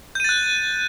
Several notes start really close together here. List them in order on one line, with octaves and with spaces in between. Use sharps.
G6 D#7 A6 F#6